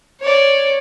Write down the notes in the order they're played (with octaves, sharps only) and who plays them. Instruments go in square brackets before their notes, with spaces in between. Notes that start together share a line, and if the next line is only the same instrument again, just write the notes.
[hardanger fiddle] C#5 D5